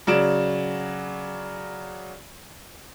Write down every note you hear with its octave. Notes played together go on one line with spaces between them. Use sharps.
C#3 F#3 D5 D7 E7